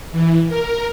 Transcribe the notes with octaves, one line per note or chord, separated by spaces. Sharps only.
E3
A#4